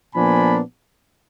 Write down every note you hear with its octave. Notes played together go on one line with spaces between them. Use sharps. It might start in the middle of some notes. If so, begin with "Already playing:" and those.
A#2 F3 B3 D4 G#5 B5